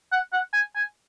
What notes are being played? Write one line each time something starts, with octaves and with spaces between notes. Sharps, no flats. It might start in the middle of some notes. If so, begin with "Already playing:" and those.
F#5
F#5
G#5
G#5